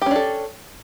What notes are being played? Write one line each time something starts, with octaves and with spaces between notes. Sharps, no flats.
C#4 D4 G4 A4